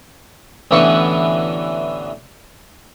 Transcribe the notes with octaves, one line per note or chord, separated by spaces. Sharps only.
A1 D3 E3 B3 C#6